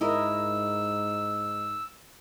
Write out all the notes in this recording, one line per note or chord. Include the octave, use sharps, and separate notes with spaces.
G#2 E4 A#4 D#5 E6